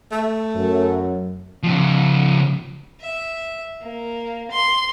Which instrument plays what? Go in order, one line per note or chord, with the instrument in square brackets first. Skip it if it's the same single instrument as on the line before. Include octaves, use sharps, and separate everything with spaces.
[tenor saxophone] A3
[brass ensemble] F#2
[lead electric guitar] C#3 F3
[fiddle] E5
A#3
C6